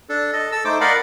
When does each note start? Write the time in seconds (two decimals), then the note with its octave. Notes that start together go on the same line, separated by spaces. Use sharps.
0.09 D4 A4
0.33 A4 D#5
0.52 A4 E6
0.65 A3 D#4 C5 D6
0.81 A#4 D5 D#5 F5 F#5 B5